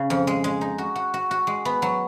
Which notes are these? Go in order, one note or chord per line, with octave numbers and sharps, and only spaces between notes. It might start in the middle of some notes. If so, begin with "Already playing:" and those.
Already playing: C#3
F2
G#3
G#3
D#4
F#4
F#4
F#4
F#4
G#3
B3
F#3